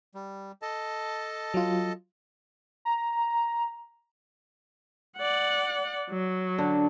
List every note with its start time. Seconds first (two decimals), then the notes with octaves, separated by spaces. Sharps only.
0.15 G3
0.62 A4 D#5 A5
1.54 F#3 F4
2.85 A#5
5.17 D5 F#5
6.10 F#3
6.58 D3